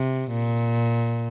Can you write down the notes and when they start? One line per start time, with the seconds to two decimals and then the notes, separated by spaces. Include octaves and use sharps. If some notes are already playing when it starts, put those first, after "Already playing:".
Already playing: C3
0.32 A#2